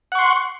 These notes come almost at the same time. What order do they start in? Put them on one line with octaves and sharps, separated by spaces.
F#5 C#6 C6